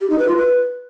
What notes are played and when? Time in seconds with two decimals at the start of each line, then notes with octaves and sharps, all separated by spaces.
0.01 G4
0.10 D#4
0.19 B4
0.28 F4
0.37 B4